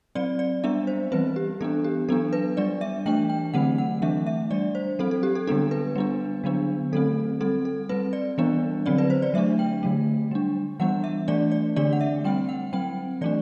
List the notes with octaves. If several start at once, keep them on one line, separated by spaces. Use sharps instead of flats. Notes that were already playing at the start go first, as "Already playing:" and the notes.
F#3 C4 D5
D5
G3 B3 D4 E5
C5
E3 G3 C4 B4
G4
E3 B3 D4 A4
G4
F#3 B3 D4 A4
B4
G3 D4 D5
E5
E3 A3 D4 G5
G5
D3 F#3 A3 C4 F#5
F#5
E3 A3 D4 E5
E5
G3 D4 D5
C5
F#3 C4 A4
A4
G4
A4
D3 G3 B3 D4 A4
B4
G3 B3 D4
D3 F#3 B3 D4
D3 F#3 A3 C4 A4
G3 C4 A4
A4
G3 C4 B4
D5
E3 G3 B3 D4
D3 F#3 C4 D5
B4
C5
D5
F#3 A3 D4 E5
G5
D3 F#3 A3
G3 D4
E3 G3 B3 D4 F#5
E5
E3 A3 D4 D5
D5
D3 A3 D4 D5
F#5
E5
G3 C4 G5
F#5
F#3 C4 G5
E3 A3 D4 D5